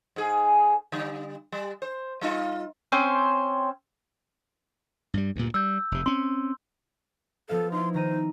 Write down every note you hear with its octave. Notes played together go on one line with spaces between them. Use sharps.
G#2 G#4
D3 G3
G3
C5
G3 D#4 F4
C4 C#4 C5
G2 G3
D2 G2 A#2
G3 E6 G6
F1 C3
C4 C#4 C6
F3 B3 A4 F5
D#4 E4 C6
D#3 C5 A#5 D#7